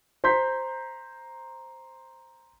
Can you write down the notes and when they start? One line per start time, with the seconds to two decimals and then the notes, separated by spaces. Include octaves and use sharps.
0.24 C5 A#5 C6 G6 B6